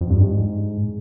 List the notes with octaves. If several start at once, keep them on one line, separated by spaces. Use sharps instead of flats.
F2
G2
G#2